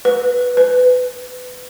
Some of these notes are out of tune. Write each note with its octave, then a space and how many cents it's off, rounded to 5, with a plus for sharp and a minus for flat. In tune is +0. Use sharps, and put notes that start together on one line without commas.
B4 +0
B4 +25